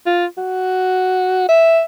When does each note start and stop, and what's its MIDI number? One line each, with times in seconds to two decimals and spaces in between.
0.06 0.26 65
0.38 1.46 66
1.49 1.83 76